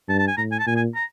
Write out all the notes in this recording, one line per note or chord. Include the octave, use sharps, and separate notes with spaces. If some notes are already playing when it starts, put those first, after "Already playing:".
G2 A5
A5
G#5
A2 A#5
G#5
A5
A#2 G#5
G#5
A#5